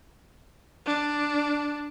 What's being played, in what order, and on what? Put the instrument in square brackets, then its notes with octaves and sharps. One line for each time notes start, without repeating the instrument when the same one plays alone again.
[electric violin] D4